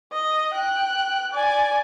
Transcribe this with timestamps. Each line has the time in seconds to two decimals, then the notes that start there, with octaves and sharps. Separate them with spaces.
0.12 D#5
0.53 G5 F#6
1.32 D5 G#5